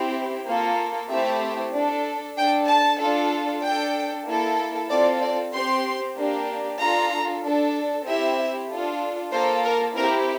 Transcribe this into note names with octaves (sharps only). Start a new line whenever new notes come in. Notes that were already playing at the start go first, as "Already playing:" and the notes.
Already playing: C4 E4 G4
A#3 F4 A4
A3 C4 E4 G4 E5
D4 A4
D4 A4 G5
A5
D4 F4 A4
D4 A4 G5
A#3 E4 A4
C4 F4 A4 D5
D5
C4 G4 C6
A#3 D4 G4
D4 F4 A4 A#5
D4 A4
C4 E4 G4 E5
D4 F4 A4
A#3 F4 A4 C5
A#4
C4 E4 G4 A#4